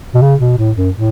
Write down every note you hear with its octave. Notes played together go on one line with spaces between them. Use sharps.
B2
C#3
B2
A2
F#2
A2